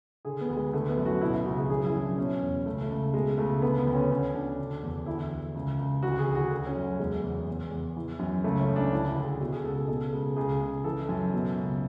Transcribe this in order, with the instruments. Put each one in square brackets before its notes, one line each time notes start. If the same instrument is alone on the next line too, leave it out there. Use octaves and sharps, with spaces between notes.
[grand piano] D3 G#4
B3
D2
G#3
D3 A3
B3
F#2
F#4
B2 E4
E4
C#2 F#4
G#4
F#2 G#4
E4
F#2
D4
B2 C#4
E2
C#2 A3
A3
C#2
B2 G#3
C#2 A3
D3 B3
B3
D2
C#4
D3 C#4
D2 D4
D3
E2
D2 E4
D2
C#2
C#2
D2 F#4
G#4
D2
F#4
D3
C#4
F#2
E2 G#3
E2
E2
E2
E3
F#2
C#2 A3
C#4
C#2
D4
D2 E4
E4
D2
G#4
B2 F#4
G#4
C#2 A4
G#4
B2 A4
C#2 G#4
C#2 G#4
C#2
E3 A4
F#2
B2
C#2